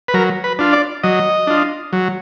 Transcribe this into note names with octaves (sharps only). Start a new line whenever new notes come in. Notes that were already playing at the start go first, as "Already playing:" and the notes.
B4
F#3 A#4
B4
D4 F4
D5
F#3 D#5
D4 F4
F#3